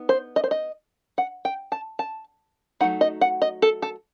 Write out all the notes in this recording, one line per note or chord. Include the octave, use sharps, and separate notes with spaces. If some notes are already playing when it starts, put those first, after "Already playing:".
Already playing: B3 D#4
C5
D#5
C5
D#5
F#5
G5
A5
A5
F#3 A3 D#4 F#5
D#5
F#5
D#5
A4
A4